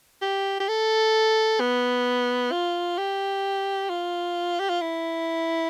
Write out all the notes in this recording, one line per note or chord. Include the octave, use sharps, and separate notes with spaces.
G4
G4
A4
B3
F4
G4
F4
G4
F4
E4